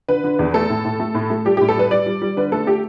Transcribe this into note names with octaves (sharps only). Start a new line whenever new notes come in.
D3 B4
D3
E2
A3 A4
A2
A2
A3
A2
A3
G3 G4
A2 G4
A4
G3 B4
G3 D5
G3
G3
D3 B4
A3 A4
A3 G4